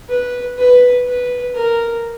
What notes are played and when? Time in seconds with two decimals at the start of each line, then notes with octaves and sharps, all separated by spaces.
0.09 B4
0.58 B4
1.07 B4
1.55 A#4